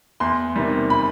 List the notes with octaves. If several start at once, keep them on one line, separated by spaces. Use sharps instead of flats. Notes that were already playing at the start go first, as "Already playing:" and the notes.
E2 C6
C3 D#3 G3
B5